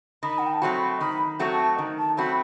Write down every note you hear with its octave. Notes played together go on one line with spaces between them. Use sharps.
D#3 B5
F#5
G5
A5
F#3 A3 C4 F#4 B5
D#3 B5
F#3 A3 C4 F#4
A5
D#3
A5
F#3 A3 C4 F#4 B5